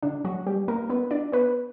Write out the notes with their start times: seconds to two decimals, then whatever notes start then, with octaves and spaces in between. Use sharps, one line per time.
0.02 D3 D4
0.24 F#3 F#4
0.47 G3 G4
0.68 A#3 A#4
0.90 B3 B4
1.11 D4 D5
1.32 B3 B4